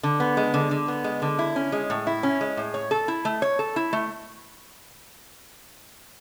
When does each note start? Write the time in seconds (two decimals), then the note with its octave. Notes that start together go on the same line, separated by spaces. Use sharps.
0.03 D3
0.20 B3
0.37 G#3
0.54 D3
0.71 D3
0.88 B3
1.04 G#3
1.22 D3
1.39 E4
1.56 C#4
1.72 G#3
1.90 A2
2.07 E4
2.23 C#4
2.41 G#3
2.57 A2
2.74 C#5
2.91 A4
3.08 E4
3.25 A3
3.42 C#5
3.59 A4
3.76 E4
3.93 A3